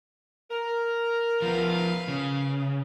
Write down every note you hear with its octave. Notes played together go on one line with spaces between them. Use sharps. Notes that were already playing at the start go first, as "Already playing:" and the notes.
A#4
F3 B3 B4 F5
C#3